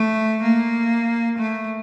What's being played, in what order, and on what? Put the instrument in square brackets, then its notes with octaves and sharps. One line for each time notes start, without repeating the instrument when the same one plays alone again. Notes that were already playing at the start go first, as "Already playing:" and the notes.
Already playing: [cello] A3
A#3
A3